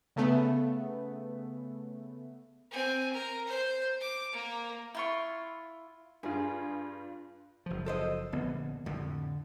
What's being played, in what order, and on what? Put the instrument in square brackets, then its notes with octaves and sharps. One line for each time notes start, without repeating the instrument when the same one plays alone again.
[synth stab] C#3 A3 B3
[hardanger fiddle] C4 G#5
A#4
C5
D6
A#3
[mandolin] E4 F4 C#6
[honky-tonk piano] G2 F4 [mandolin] G#4
[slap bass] F#1 F3
[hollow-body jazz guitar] A4 C5 D#5
[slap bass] A#1 B3 [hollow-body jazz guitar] D3
[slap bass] F2 A2 [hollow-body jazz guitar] D3